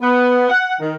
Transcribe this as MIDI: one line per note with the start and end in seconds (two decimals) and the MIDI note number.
0.02 0.48 59
0.50 0.75 78
0.80 0.95 51